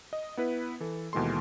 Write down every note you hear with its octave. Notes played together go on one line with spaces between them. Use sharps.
D#5
B3 E4 B4
E3 A4
D#2 B2 E3 G#3 A4 C6